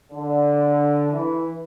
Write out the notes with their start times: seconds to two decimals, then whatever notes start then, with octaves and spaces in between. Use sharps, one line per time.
0.13 D3
1.13 E3